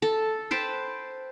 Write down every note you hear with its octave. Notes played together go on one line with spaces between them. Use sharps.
A4
B4 C5 G5 A5